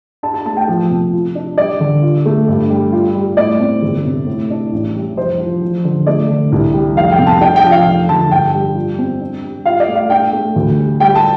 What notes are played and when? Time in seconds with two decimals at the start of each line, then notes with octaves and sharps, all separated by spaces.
0.23 D4 A5
0.34 A5
0.45 A3 A5
0.57 G5
0.68 F3
0.90 C3
1.14 F4
1.35 D4
1.58 G3 D5
1.80 D3
2.02 F4
2.25 A3
2.48 G2
2.70 G3
2.93 F4
3.15 G3
3.37 A2 D5
3.59 C4
3.82 G1
4.05 C3
4.27 A2
4.50 D4
4.72 A1
4.95 G3
5.16 F1 C5
5.40 F3
5.62 F3
5.84 D3
6.07 A3 D5
6.29 D3
6.52 C2
6.73 G3
6.96 F1 F5
7.12 G5
7.19 C3
7.27 A5
7.41 D4 G5
7.56 G5
7.63 F3
7.72 F5
7.86 F1
8.09 D3 A5
8.31 G2 G5
8.54 G3
8.75 F4
8.98 C4
9.21 D4
9.43 G3
9.65 F4 F5
9.80 D5
9.88 A3
9.95 F5
10.10 D4 G5
10.33 A3
10.56 D2
10.78 G3
11.00 G3 G5
11.15 A5